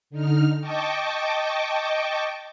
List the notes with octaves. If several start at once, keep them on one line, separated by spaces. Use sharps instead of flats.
D3 D#4 F6
D#5 G5 A5 C#6 D6